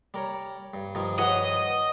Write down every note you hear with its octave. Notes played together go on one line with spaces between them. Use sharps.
G3 A#4 C#5
G2
G2 D#3 F3
B4 C#5 D#5 F#5